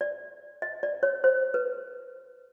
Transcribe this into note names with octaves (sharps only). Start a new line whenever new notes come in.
D5
D#5
D5
C#5
C5
B4